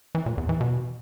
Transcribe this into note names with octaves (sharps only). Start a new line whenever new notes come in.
E3
A#2
E2
E3
B2